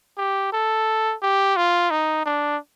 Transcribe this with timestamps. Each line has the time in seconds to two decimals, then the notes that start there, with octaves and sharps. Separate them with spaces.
0.17 G4
0.53 A4
1.22 G4
1.56 F4
1.91 D#4
2.26 D4